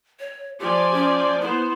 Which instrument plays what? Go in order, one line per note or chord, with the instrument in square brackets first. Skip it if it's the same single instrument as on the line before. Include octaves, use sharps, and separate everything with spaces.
[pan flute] C#5
[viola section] F3 D5 G#5 [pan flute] G4
[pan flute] C#4
[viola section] B3 C5 [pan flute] E4